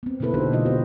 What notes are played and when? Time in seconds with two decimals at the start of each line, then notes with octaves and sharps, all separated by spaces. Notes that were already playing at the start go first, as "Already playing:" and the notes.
0.03 B3 C4
0.20 B2 D3 A#3 E4 A4 B4
0.34 D3 D4 D#4 F#4 G4 C5
0.52 B2 E3 G#3 D#4 F4 D#5
0.65 B3 C4 F#4 G4 C5